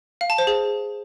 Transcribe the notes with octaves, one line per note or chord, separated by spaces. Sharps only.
F5
A5
C5
G#4